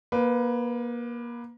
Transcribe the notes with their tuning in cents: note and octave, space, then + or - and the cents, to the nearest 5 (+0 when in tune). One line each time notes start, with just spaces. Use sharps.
A#3 +30 B4 +10